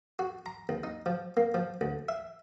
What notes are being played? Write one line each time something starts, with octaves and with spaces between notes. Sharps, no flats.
F#4
A#5
D#2
D#4
F3
A#3
F3
D2
E5